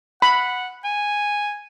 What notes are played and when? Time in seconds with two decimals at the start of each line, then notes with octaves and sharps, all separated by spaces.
0.22 F#5 B5
0.84 G#5